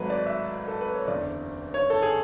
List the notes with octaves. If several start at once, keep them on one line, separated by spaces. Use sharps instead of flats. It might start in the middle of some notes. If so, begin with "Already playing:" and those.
Already playing: G#1 G#2 F#3 A3 B4
D5
E5
A4
B4
C#5
F#1 E2 D3 D5
C#5
A4
G#4